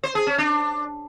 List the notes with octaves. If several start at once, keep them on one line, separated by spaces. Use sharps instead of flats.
C5
G#4
C#4
D4